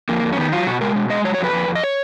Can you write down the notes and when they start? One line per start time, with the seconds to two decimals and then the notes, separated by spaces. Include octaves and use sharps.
0.09 F2 A#3
0.23 F2
0.33 C#4
0.37 D#3 B3
0.52 F#3 F4
0.67 B2 F#4
0.81 G#3 A#4
0.96 B2
1.10 G#3 D#5
1.24 F#3 C#5
1.34 C#5
1.38 F2
1.44 B4
1.53 F2
1.68 F2
1.75 D#5
1.84 C#5